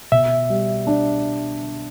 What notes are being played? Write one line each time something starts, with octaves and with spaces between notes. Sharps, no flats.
B2 E5
G3
D4